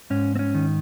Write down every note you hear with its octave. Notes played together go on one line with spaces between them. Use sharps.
G#2 C#4
C4
C#4
D#3